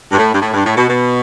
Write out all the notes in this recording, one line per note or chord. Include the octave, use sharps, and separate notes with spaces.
G2
A2
G2
A2
G2
A2
B2
B2